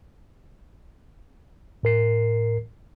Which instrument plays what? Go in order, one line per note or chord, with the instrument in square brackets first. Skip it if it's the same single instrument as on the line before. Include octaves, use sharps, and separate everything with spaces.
[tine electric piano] A2 A#4 C7